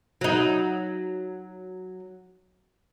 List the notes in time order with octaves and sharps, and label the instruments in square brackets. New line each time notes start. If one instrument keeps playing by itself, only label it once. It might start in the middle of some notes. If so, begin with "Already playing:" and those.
[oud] F#3 D#4